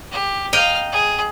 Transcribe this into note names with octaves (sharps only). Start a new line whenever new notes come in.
G4
D#5 F5 G5 A#5 F6
G#4